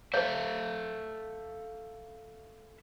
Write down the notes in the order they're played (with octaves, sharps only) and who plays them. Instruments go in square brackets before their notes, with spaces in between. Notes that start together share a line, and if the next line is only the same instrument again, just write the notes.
[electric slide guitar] A4 E5 F5 [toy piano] C5 C#5